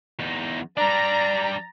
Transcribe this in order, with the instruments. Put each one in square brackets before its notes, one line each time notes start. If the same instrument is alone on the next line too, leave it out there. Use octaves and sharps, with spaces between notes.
[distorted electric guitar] E2 D#4
[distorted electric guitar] G3 D4 [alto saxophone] D5 [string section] A#5